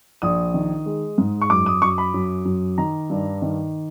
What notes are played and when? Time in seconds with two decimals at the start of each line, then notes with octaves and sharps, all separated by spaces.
0.22 A#1 D#6
0.54 D#3
0.86 G#3
1.18 G#2
1.42 C#6
1.50 F#2 D6
1.66 D#6
1.82 F#2 C#6
1.98 B5
2.14 F#2
2.45 F#2
2.78 D#3 A#5
3.10 G2
3.42 D#3